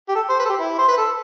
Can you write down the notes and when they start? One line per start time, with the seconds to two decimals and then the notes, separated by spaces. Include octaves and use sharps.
0.09 G4
0.15 A4
0.30 C5
0.40 B4
0.45 A4
0.49 G4
0.59 E4
0.79 C5
0.88 B4
0.98 A4